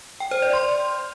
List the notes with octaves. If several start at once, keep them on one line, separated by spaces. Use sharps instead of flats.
G5
C5
D5
C6